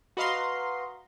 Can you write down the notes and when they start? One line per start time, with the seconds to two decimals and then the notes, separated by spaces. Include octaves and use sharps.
0.17 F#4 B4 D#5 F5 A#5 C6